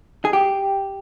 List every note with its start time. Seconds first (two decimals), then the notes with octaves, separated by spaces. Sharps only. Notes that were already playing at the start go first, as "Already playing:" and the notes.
0.25 G#4
0.33 G4